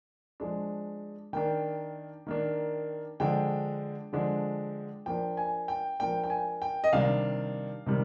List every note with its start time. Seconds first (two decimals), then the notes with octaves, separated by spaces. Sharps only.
0.40 F3 G#3 D4
1.33 D#3 A#3 D4 G5
2.27 D#3 A#3 D4
3.20 D3 F3 G#3 D4 G5
4.13 D3 F3 G#3 D4
5.06 F3 A#3 D4 G5
5.37 G#5
5.68 G5
6.00 F3 A#3 D4 G5
6.24 G5
6.30 G#5
6.62 G5
6.84 D#5
6.93 C3 D#3 G3 D4 F5
7.86 C3 D#3 G3